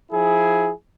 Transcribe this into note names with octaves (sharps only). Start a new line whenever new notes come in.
F3 E4 G#4